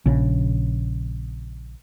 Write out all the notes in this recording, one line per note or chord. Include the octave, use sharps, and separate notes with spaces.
A#1 C#3